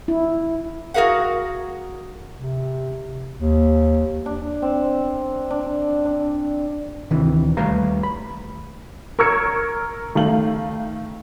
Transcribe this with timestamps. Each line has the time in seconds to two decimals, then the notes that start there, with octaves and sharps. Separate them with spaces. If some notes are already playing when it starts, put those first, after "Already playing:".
0.08 E4
0.94 F#4 G#4 A#4 F5 F#5
2.35 C3
3.38 D#2
4.26 D4
4.62 C4
5.50 D4
6.05 D4
7.11 D2 C3 D#3 E3
7.57 D#2 G3 A3 B4 F5 A#5
8.03 B5
9.19 A#4 C#6 E6 G#6 C#7
10.15 D#3 A3 F5 F#7